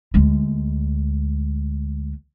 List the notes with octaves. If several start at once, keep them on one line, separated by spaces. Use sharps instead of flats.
D2 G#3